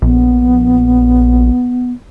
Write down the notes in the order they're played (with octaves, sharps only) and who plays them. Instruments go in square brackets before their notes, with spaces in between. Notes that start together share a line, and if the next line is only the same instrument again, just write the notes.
[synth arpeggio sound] A#1 [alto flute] B3